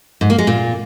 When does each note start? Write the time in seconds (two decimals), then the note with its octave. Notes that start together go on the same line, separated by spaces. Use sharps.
0.21 G#2
0.30 A#3
0.38 G#3
0.47 A#2